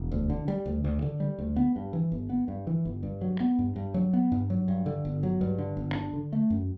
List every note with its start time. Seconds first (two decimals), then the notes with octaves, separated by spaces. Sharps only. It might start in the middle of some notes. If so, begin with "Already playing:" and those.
Already playing: E1
0.11 D2
0.30 D3
0.48 G3
0.66 D2
0.84 D2
1.02 D3
1.20 G3
1.39 D2
1.56 B3
1.76 G2
1.93 E3
2.12 G1
2.30 B3
2.48 G2
2.67 E3
2.85 G1
3.03 G2
3.21 F#3
3.40 B3
3.59 G2
3.76 G2
3.94 F#3
4.13 B3
4.32 G2
4.50 F#3
4.68 G2
4.86 D3
5.05 G1
5.23 F#3
5.41 G2
5.58 D3
5.77 G1
5.95 D4
6.13 D3
6.33 A3
6.50 F#2